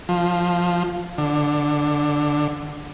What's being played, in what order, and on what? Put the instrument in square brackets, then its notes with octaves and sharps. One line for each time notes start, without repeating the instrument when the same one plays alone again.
[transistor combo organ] F3
D3